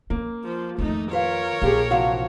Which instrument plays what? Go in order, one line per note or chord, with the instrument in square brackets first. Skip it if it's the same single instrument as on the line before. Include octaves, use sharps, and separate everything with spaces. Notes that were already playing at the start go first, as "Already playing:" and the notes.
[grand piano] A#3 [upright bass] C#4
[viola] F3
[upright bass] F2 D#3 [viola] A3 D#4
[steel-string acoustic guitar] F4 B4 F5 [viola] A#4 C#5
[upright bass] A#1 [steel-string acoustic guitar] F3 G4 G#4
[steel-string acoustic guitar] C3 E3 F3 [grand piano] F#4 F5